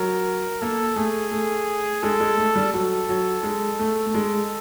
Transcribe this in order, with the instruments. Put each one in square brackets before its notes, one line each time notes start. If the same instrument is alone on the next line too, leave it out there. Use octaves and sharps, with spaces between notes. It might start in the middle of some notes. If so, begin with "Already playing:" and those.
Already playing: [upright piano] F#3 [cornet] A#4
[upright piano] A#3 [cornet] A4
[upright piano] A3 [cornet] G#4
[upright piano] A3
[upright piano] G#3 [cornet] A4
[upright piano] G#3
A3
G3
[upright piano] F#3 [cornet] A4
[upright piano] F#3
G#3
A3
A3
G#3